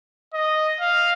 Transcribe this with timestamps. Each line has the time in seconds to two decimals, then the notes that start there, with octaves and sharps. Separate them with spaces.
0.34 D#5
0.81 F5